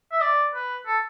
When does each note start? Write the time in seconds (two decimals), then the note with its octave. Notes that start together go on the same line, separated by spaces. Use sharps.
0.12 E5
0.21 D5
0.55 B4
0.87 A4